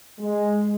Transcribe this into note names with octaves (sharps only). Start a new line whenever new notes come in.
G#3